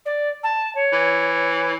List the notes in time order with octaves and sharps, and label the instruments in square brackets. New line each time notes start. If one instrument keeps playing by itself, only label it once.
[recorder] D5
A5
C#5
[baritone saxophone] E3